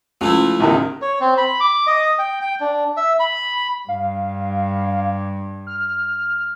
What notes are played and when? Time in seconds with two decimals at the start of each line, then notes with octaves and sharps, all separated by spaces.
0.21 C#2 F3 A3 E4
0.60 A1 E2 D#3
1.02 C#5
1.21 C4
1.38 B5
1.60 D6
1.87 D#5
2.19 G5
2.41 G5
2.60 D4
2.97 E5
3.20 B5
3.89 G2 F5
5.67 F6